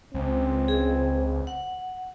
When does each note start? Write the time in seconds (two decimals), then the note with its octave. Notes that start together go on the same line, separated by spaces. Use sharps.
0.14 C#2 C4
0.68 G#4
1.47 F#5